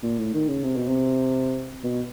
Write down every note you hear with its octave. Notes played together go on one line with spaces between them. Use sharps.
A#2
A2
D#3
C#3
C3
B2
C3
B2